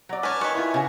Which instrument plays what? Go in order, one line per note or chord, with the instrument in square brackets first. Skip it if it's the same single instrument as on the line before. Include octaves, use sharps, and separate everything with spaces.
[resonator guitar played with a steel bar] F#3 D5
[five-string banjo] C#4 B4 [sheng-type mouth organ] G#5 A5 F6
[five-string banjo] D#3 C#5 [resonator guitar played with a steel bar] B4
[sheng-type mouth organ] E4 G#5 [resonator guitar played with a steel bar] F4 B4
[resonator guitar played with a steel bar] C#3 F#4